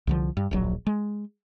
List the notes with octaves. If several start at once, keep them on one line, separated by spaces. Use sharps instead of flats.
C2 D3 F3
G2
D1 A#1 F#3
G#3